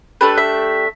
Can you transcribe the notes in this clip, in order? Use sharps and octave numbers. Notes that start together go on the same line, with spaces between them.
A3 D4 G4 B4
E5